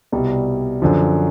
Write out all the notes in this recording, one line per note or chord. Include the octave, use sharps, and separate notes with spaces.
C2 B2 G3
F#2 D3 F3